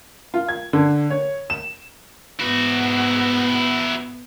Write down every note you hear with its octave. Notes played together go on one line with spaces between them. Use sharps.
F4
G#6
D3
C#5
E7
G#2 B3 E4 F#4